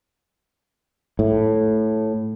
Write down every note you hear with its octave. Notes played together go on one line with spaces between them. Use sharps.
A2